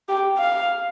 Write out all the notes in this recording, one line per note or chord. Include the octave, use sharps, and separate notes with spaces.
G4
F5